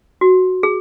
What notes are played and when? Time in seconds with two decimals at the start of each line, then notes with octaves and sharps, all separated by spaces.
0.21 F#4
0.63 G#4